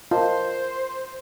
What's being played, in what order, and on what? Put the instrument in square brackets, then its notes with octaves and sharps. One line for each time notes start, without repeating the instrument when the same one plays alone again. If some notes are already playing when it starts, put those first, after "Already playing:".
[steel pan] F4 [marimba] A#4 D#5 A5 [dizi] C5